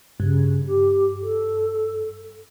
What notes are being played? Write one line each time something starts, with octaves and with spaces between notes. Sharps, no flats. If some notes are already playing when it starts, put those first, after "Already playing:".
G2 C#3
G4
A4